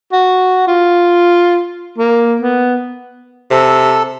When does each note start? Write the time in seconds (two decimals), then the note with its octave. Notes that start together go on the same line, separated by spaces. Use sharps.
0.12 F#4
0.67 F4
1.98 A#3
2.42 B3
3.51 C3 A4